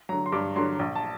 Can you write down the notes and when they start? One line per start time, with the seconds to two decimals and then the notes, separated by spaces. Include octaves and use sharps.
0.09 D3 F#3 A#5
0.26 C6
0.32 G2 D6
0.56 D3 F#3 C6
0.79 A#1
0.95 A5